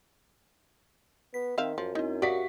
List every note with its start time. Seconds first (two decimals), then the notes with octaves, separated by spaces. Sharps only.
1.34 B3 B6
1.58 D#3 C4 E5 F5
1.78 F#2 F3
1.95 C4 D#4 E4
2.22 F#4 G4 D5 E5 F5 B6